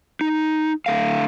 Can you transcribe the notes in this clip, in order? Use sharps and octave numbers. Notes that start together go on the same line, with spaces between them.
D#4
D3 A3 F5